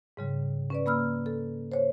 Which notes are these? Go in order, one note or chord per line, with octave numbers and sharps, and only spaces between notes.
G#2 C#3 G3
C#4 B4 D5
A#3 B5 E6 F6
A4
C5 C#5